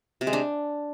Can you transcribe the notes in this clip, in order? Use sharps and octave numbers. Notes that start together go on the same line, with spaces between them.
C3
G#3
D4